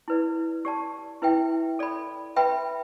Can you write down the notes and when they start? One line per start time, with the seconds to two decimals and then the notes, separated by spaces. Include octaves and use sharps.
0.08 E4 B4 D5
0.65 G4 D5 A5
1.22 E4 B4 E5 G5
1.79 A4 D5 B5
2.36 B4 E5 G5 B5